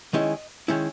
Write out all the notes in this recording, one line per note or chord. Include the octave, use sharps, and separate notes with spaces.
D#3 G#3 C#4 E4 D#5
D#3 G#3 C#4 E4